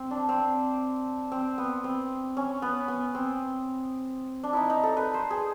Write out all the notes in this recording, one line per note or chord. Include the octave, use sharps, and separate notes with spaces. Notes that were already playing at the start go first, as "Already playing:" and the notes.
Already playing: C4
D4
C4
C4
B3
C4
C#4
B3
B3
C4
D4
D#4 E4
D#4
A4
B4
C5
G#4